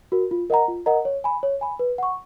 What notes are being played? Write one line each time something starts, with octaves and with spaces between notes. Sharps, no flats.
F#4 A#4
F4
A#4 D#5 F#5 A#5
F4
A#4 D#5 F#5 A#5
C#5
G#5 B5
C#5
G#5 B5
B4
F#5 C#6